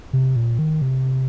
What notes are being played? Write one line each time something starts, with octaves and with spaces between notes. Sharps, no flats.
C3
A#2
D#3
C3